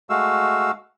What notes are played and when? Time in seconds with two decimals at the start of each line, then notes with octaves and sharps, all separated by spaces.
0.10 G#3 A3 F#4 F5 E6